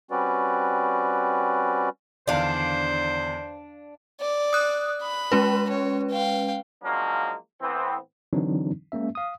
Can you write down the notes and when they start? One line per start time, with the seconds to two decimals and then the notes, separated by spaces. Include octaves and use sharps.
0.11 G3 C4 C#4 F#4 B4 D5
2.28 E2 D3 D#3 D4 C5 F5
4.20 D5
4.53 D#6 F#6
5.03 B5
5.32 G#3 C#4 B4
5.69 C#5
6.11 F5 G5
6.83 F3 F#3 G#3 A#3 C#4 D4
7.61 A2 E3 B3 C4
8.33 D3 E3 F#3 C4 D4 D#4
8.92 G#3 A#3 C#4 E5
9.15 F5 D#6